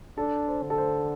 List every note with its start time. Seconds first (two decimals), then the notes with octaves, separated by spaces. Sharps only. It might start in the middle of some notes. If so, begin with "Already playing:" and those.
0.17 D4 A4
0.48 C5
0.63 D3
0.70 A4
0.78 C5